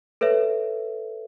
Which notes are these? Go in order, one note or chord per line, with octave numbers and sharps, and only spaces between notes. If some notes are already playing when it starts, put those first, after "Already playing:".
A4 B4 C#5 E5